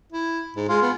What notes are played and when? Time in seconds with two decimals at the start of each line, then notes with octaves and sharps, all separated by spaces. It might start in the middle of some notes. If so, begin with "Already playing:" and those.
0.12 E4
0.57 G#2
0.69 G#3 F4
0.82 B3